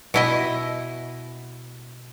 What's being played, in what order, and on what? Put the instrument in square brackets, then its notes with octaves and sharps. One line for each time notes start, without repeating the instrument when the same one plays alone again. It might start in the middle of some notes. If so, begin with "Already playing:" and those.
[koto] B2 E4 D#5